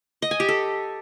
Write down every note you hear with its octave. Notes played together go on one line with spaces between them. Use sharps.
D#5
G#5
G4
A4